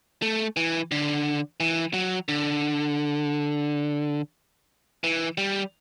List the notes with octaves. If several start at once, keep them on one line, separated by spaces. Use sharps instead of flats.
A3
E3
D3
E3
F#3
D3
E3
G3